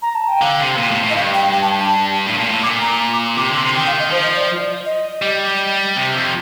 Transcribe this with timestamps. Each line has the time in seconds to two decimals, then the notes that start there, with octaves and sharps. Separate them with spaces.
0.02 A#5
0.15 A5
0.28 G5
0.42 D3 F5
0.60 C3
0.78 A#2
0.91 A2
1.03 A2
1.10 D#5
1.15 G2 F5
1.34 G5
1.52 G5
1.62 A5
1.80 A5
2.26 A2
2.38 A#2
2.49 A2
2.63 A#2 D6
2.81 A#5
3.13 D6
3.38 C3 D6
3.50 D3
3.56 C6
3.62 C3
3.74 D#3 G5
3.87 F5
3.99 D#5
4.11 F3 C5
4.23 D#5
4.36 D5
4.86 D#5
5.22 G3
5.96 C3
6.14 F2